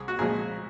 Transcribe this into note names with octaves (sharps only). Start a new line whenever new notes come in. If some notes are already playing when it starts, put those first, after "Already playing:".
Already playing: C2 G#4
F#4
A#2 F3 G#3 G#4